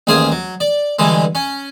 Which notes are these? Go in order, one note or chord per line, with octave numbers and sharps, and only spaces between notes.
A1 D#2 G#4 C5 F5 D#6
F#3
D5
G2 D3 E3 G#3
C#4